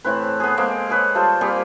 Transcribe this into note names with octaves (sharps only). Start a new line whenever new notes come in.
A2 E3 C4 B4
B3 G#4
G#3 A#3 C4
G#4 B4 C#5
G3 F4 A4 C5
G3 A#3 C4 G#4